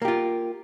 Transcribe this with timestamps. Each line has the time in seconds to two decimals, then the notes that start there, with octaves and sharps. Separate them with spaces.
0.02 A#3
0.05 G4
0.08 F4